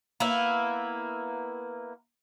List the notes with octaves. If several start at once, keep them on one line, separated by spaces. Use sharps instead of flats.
A#3 B3 E4